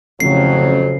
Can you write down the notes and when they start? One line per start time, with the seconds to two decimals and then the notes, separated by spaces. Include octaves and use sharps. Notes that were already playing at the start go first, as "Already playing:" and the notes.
0.20 A1 F2 C#3 F#3 C7